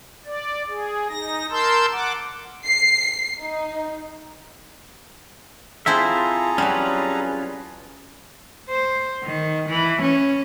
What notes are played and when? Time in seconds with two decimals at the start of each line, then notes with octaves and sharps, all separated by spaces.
0.26 D5
0.67 G#4
1.09 D#4 A#6
1.50 A#4 A5 C6 E6 G6
1.92 F#5 D6
2.65 C7
3.42 D#4
5.86 C4 E4 F4 G#4 A4 C5 E5 A#5
6.58 F#3 G3 C#4 F4 B4
8.69 C5
9.24 D#3
9.69 E3
10.02 C#4